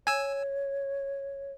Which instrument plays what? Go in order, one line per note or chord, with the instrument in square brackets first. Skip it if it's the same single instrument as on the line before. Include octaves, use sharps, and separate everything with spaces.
[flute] C#5 [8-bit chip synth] G#5 E6